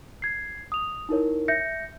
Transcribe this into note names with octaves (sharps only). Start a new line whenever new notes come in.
G#6 C7
D#6 F7
D#4 E4 A#4 C#5
E5 G6 A#6 C#7